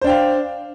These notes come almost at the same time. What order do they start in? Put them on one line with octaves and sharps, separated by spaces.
C5 D4 G5 F5